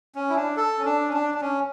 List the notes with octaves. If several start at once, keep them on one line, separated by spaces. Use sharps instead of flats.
C#4
E4
D4
A4
C#4
D4
C#4
D4
D4
C#4